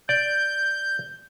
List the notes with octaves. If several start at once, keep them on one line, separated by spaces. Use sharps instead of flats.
D5 G6